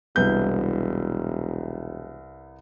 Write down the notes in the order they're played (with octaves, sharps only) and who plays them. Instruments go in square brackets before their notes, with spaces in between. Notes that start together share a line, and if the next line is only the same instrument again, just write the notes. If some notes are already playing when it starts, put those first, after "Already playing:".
[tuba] E1 [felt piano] C2 B3 G6